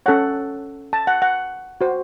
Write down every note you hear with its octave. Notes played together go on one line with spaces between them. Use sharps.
C#4 A4 C#5 F#5
A5
F#5
F#5
F#4 C5